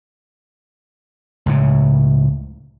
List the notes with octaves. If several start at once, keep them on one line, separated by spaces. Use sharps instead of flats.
C#2 A2 C#3